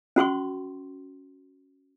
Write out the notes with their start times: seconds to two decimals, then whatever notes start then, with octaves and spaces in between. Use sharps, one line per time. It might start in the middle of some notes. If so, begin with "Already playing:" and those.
0.16 C#4 F#4 C6 C#6